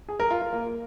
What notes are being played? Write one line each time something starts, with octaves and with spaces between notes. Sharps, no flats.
G#4
A#4
F4
F4
A#3